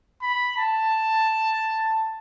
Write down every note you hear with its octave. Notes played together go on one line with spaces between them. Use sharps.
B5
A5